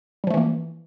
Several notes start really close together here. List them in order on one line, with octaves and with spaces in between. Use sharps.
G3 F3 A3 E3 A#3